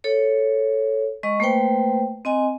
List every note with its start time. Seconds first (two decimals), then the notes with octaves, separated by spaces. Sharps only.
0.04 A4 C#5
1.23 G#3 D#5 C#6
1.40 A3 A#3 B4 C5 G5
2.25 C4 D#5 G#5